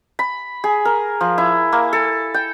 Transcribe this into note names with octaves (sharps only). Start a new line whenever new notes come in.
B5
G#4
A#4
F3
E4
A#3
A4
G5